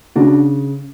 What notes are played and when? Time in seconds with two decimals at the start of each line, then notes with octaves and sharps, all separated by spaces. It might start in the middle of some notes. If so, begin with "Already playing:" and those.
0.16 C#3 D4 F#4